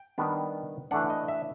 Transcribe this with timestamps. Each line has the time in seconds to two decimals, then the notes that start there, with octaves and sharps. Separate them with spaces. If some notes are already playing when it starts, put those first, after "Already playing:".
Already playing: G5
0.18 D#3 G3 B3 D4
0.91 E3 A3 D4 F#5
1.10 D#5
1.28 E5